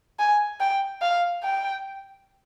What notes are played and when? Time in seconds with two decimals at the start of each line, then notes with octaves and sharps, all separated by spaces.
0.19 G#5
0.60 G5
1.02 F5
1.43 G5